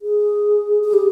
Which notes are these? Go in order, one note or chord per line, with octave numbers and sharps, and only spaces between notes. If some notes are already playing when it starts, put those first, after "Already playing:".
G#4
G#4
G4